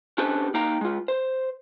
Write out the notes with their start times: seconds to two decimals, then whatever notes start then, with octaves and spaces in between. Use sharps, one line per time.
0.18 C#4 D4 G4 A4 B4 C5
0.54 A#3 D#4 F5 G5 A#5
0.81 G#3 F4
1.08 C5